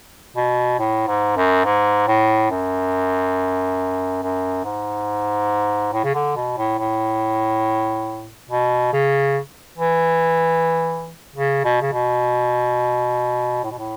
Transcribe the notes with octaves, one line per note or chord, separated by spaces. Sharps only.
B2
A2
G#2
F#2
G#2
A2
F#2
F#2
G#2
A2
C#3
D3
B2
A2
A2
B2
C#3
E3
C#3
B2
C#3
B2
A2
B2
A2